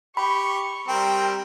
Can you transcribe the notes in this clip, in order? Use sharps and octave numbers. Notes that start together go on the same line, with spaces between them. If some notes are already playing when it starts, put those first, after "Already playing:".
G4 B5 C#6
G3 C4 A#4 G5